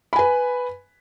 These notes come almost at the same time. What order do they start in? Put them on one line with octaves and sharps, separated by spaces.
B5 G#5 B4